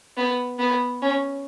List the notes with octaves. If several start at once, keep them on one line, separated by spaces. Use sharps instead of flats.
B3
B3
C#4